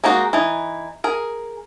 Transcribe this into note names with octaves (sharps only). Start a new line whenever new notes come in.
G#3 A#3 D#4 F#4
E3 D#4
G#4 A#4